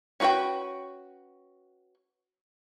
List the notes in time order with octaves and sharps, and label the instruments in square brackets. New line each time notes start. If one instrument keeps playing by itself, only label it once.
[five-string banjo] C#4 D#4 F#4 B4 G5